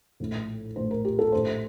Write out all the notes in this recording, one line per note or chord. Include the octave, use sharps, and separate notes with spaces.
A#1 A2
A#1 A2 C5
A#4
G4
A4
A#1 A2 C5